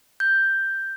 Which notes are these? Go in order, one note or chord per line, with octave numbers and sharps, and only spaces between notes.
G6